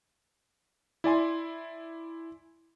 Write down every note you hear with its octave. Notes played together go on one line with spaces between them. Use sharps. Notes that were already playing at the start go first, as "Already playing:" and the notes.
E4 D5 G#5 C6